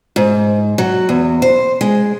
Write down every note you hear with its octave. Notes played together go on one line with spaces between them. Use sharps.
G#2
F#3
E2
C5
G#3